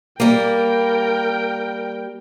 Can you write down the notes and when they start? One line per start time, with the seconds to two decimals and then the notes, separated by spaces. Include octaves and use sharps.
0.20 G3 A#3 A#4 G5